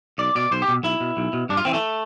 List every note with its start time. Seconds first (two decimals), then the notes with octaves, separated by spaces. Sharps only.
0.18 B1 D5
0.35 B2 D5
0.51 B1 C5
0.62 G4
0.68 B2
0.84 B1 E4
1.00 B2
1.17 B1
1.33 B2
1.49 G2 D4
1.57 F4
1.65 E3 C4
1.74 A3